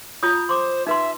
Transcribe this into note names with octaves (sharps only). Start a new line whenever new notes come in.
F4 C#5 A#5 D#6
C5 C6 D6
D#4 B4 E5 C6